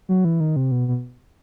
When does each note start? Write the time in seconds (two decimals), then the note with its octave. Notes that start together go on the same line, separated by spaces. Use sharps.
0.09 F#3
0.25 E3
0.40 D#3
0.56 C3
0.71 B2
0.88 B2